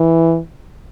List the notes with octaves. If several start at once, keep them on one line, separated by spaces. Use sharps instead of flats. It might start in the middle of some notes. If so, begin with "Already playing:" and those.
Already playing: E3